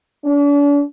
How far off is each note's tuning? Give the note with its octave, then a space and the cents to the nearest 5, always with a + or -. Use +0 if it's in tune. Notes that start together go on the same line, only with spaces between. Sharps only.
D4 -40